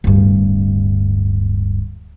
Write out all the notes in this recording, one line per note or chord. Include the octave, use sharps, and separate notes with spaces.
D1 G2